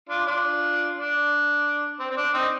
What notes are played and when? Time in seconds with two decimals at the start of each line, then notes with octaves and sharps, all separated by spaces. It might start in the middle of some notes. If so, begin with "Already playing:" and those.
0.09 D4 F4
0.26 D4 F4
0.96 D4
2.00 C4
2.11 C4
2.17 D4
2.34 C4 D#4